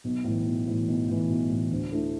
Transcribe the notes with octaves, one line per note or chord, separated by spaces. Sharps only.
B1
A2 E3
B1
A2 E3
B1
A2 E3
B1
A2 E3
D2
D3 A3 E4